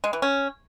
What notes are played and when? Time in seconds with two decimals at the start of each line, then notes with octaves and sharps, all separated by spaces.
0.04 G#3
0.13 E3
0.22 C#4